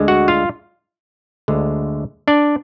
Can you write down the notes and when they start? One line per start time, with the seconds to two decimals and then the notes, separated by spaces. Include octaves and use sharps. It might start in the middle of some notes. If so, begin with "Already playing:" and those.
Already playing: D2 D3 G#3
0.08 F#4 F#5
0.28 F4 F5
1.48 D2 D3 G#3
2.28 D4 D5